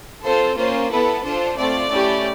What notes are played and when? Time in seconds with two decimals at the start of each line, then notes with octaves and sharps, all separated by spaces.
0.24 C4 F4 A4 C5
0.57 A#3 C#4 F4 C5
0.91 B3 E4 A4 B4
1.24 D4 F4 A4 C5
1.56 A3 C4 F4 D5
1.90 A3 C#4 E4 G4